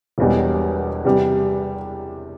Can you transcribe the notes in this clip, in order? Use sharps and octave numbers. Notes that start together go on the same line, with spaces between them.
E1 E2 B2 G3
E2 C3 G3